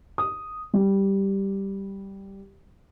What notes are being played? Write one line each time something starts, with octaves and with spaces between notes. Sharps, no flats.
D#6
G3